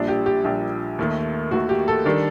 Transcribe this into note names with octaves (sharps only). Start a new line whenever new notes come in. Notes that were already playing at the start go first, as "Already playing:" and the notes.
Already playing: A#1 A#2 G3 D4
G4
G4
A#1 A#2 G3 D4 G4
D#2 D#3 A3
D#2 D#3 A3 F#4
G4
A4
D#3 G3 D4